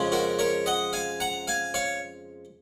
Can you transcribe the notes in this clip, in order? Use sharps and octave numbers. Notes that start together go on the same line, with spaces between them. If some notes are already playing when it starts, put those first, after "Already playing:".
Already playing: F2 C#3 G#3 C#4
F#4 A#4
A#4 C#5
D#5 F#5
F5 G#5
F#5 A#5
F5 G#5
C#5 F5